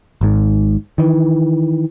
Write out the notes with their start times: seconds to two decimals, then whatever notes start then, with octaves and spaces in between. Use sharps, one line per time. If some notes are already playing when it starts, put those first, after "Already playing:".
0.21 G#1 G#2
0.98 D#3 E3